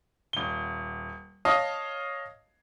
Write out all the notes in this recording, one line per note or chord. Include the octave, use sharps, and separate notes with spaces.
D#1 G7
C#5 D#5 F5 A5 D#6